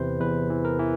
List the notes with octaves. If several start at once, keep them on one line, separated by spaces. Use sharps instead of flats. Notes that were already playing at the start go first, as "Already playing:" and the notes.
Already playing: E2 C3 E3 B4 C5
E2 B4
E3
A#4
E3